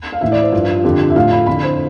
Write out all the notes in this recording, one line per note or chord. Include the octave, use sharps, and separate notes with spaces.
F5
A2 E3 E5
D5
C5
G2 F3 F4
F2 D3 F3 G4
E5
A2 F3 F5
B5
F2 D3 F3 B5
C5